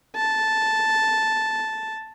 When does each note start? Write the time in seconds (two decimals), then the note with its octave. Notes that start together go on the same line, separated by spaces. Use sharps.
0.16 A5